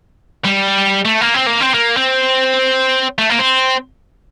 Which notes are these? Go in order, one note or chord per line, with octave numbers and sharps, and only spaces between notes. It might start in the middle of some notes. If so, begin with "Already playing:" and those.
G3
A3
A#3
C4
A#3
C4
A#3
C4
A3
A#3
C4